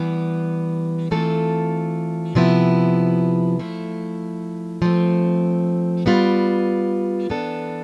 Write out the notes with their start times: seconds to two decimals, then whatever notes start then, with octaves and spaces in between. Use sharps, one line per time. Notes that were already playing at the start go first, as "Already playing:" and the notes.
Already playing: E3 G3 B3
1.11 E3 A3 C4 F4 A4
2.35 C3 F3 B3 E4
3.59 F3 A3 E4
4.82 F3 A3 C4
6.06 G3 B3 F4 B4
7.29 E3 B3 D4 A4